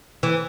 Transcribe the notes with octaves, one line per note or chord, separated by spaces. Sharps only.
E3